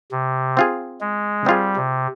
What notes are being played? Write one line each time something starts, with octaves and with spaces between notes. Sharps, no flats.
C3
C4 F4 G#4
G#3
G3 C4 F4 G#4
C3